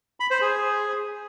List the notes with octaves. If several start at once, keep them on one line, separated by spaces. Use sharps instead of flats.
B5
C5
G#4